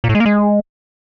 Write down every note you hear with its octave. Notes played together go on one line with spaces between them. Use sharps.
A#2
A2
G#3
A#3
G#3